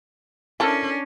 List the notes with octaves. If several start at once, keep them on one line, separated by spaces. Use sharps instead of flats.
C#4 D4 E4 A4 A#4